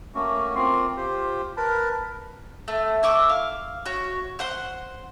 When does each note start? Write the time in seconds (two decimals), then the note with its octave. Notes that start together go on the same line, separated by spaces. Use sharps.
0.14 A3 A#3 C#4 F#4
0.56 A#3 C4 F4 C6
0.97 F4 G4 C5
1.57 A#4 B4 A5 B5
2.68 A3
3.03 E4 C#6 D6 E6
3.29 F5
3.86 F#4 C#5
4.39 C5 F#5 C6